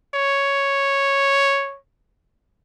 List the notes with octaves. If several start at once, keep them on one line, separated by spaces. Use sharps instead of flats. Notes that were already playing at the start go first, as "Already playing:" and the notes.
C#5